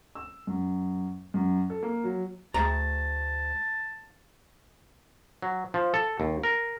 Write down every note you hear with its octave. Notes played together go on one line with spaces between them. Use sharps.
E6
F#2
F#2
A4
A#3
F#3
D2 A3 G#4 A5 A#5
F#3
F3
A4
D#2
A#4